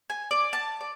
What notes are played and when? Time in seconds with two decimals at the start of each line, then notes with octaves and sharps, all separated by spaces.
0.10 G#5
0.31 D5
0.53 A5
0.81 D5